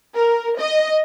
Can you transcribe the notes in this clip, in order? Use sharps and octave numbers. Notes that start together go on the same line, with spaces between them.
A#4
D#5